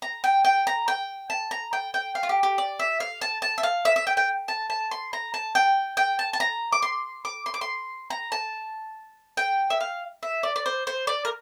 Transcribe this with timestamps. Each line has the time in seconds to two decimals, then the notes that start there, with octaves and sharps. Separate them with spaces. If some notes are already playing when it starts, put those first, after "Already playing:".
0.02 A#5
0.24 G5
0.45 G5
0.67 A#5
0.88 G5
1.30 A5
1.51 A#5
1.73 G5
1.94 G5
2.15 F5
2.23 F4
2.29 G4
2.43 G4
2.58 D5
2.79 E5
3.00 F5
3.21 A5
3.42 A5
3.58 E5
3.63 F5
3.85 E5
3.96 E5
4.07 G5
4.17 G5
4.48 A5
4.70 A5
4.91 C6
5.13 A#5
5.34 A5
5.55 G5
5.97 G5
6.19 A5
6.33 A5
6.40 A#5
6.73 D6
6.82 C6
7.25 D6
7.46 C6
7.54 D6
7.61 C6
8.10 A#5
8.32 A5
9.37 G5
9.70 E5
9.81 F5
10.23 E5
10.43 D5
10.56 D5
10.66 C5
10.87 C5
11.07 D5
11.25 A#4